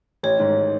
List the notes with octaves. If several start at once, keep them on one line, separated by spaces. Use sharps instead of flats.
A1 C#5
G#2 D#3